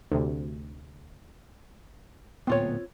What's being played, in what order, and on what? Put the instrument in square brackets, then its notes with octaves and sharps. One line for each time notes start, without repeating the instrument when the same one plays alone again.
[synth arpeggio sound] D2 C3
[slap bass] D1 A#2 B3 [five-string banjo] C4 F4 C#5